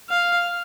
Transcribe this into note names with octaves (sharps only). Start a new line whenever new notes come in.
F5